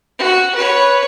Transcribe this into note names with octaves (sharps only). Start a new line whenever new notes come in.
F#4
B4 C#5